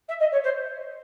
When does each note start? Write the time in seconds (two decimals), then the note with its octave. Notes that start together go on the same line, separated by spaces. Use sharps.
0.08 E5
0.20 D#5
0.32 C#5
0.43 C5